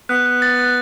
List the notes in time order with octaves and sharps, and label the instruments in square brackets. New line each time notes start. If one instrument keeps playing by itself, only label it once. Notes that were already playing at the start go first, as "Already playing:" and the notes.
[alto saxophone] B3 [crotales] F#6
[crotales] F#6
A6
F#6